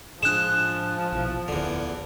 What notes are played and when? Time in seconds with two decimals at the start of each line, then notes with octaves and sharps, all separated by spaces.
0.23 A2 F3 G#3 D4 F#6 E7
1.12 A#1 B2 E3
1.48 D1 E2 D3